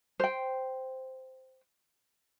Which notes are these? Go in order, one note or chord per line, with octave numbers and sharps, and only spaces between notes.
C5 G5